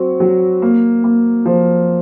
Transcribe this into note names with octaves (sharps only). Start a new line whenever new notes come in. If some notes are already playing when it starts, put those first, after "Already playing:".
Already playing: F#3 C4 F#4
F#3
A#3
A#3
F3